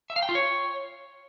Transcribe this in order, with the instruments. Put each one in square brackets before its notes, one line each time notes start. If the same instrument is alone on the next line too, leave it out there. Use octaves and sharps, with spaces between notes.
[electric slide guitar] E5
F5
G5
F4
C#5